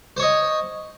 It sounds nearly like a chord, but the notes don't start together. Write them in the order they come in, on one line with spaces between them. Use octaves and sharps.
C5 C#5 D#5